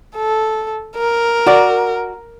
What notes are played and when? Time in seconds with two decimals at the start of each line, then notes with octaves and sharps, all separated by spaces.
0.16 A4
0.97 A#4
1.47 F#4 D5